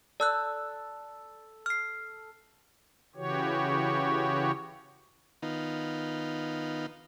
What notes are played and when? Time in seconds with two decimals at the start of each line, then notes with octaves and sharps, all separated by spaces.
0.20 A4 D5 E6 F#6
1.66 F6 C7
3.16 C#3 E3 F#4 G4 C#5
5.42 D#3 B3 D#4 F4